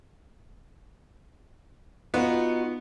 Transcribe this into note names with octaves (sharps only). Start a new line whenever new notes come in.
B3 D#4 F4 F#4